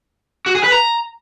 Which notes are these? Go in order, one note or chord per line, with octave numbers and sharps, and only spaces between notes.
F#4
G#4
B4
A#5